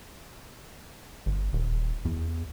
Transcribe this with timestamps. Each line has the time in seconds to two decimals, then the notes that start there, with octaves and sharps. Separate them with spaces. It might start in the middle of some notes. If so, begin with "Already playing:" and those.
1.26 G1
1.53 D#1
2.05 E2